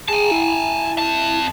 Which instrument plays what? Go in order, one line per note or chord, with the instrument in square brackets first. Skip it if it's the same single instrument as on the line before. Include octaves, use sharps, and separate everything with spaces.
[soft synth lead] G#4 [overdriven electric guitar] G#5 A5
[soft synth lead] E4
[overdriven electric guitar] F2 A5